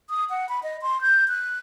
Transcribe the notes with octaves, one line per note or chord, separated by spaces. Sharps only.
D#6
F#5
B5
D#5
C6
G6
F#6